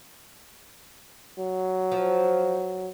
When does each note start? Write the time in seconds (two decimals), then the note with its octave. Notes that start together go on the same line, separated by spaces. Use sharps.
1.38 F#3
1.92 F3